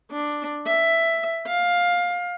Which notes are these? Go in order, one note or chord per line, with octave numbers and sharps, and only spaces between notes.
D4
E5
F5